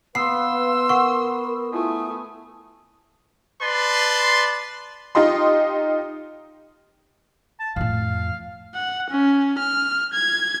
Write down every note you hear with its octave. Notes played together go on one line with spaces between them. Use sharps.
B3 B4 F5 C6 E6 C7
A#4 F#5 C#6
A3 E4 F4 G#5 D#6
B4 D5 A5 C6
D#4 F4 G4 D#5 C6
A5
F2 A2 F5
F#5
C#4
F6
G#6